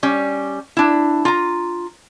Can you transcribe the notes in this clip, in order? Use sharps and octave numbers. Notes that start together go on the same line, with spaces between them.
G3 C#4
D4 E4
F4 A#5